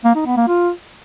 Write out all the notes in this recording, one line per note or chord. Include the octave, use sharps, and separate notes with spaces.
A#3
D#4
B3
A#3
F4